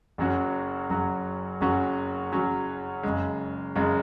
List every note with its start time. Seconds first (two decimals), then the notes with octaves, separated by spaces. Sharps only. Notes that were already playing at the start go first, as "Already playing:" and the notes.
0.18 F#1 F#2 F#3 C#4 F#4
0.90 F#1 F#2 F#3 C#4 F#4
1.61 F#1 F#2 F#3 C#4 F#4
2.32 F#1 F#2 F#3 C#4 F#4
3.03 F#1 F#2 C#3 G#3
3.75 F#1 F#2 C#3 G#3